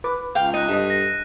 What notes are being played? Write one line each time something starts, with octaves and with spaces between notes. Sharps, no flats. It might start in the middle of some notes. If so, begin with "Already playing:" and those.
B4 D6
C#2 F5 G5
D#4 D#5 F#6 D#7
G2 A4 D#5 E5
A#6